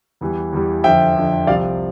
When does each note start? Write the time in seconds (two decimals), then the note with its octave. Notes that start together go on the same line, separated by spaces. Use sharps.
0.21 E2 E3 G3
0.53 E2 E3 G3
0.84 F2 D3 F3 E5 G5
1.16 F2 D3 F3
1.47 C2 C3 F3 D5 F5